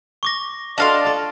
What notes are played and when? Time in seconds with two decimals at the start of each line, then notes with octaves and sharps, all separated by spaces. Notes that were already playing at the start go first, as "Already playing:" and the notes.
0.23 C#6 D6 A#6
0.78 D4 F#4 A4 D5 D#5 F5 A5 C6
1.05 F4 A4